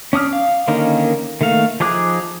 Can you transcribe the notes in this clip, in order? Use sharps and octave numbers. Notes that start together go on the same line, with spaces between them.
C#4 D4 D#6 F6
F5
D3 D#3 A#3 C#4 D#4
D#3 A3 A#3 F5
F3 D#4 G#4 D6 F#6